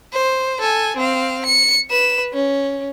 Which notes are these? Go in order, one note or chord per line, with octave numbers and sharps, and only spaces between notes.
C5
A4 G#5
C4 F5
C#7
B4 E7
C#4